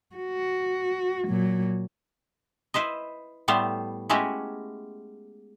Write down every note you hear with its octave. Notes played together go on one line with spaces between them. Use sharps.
F#4
A#2 F#3
E4 B4 C5 D#5
A2 G3 A3 B3 C5
G#3 A3 C#4 E4 F#4 G4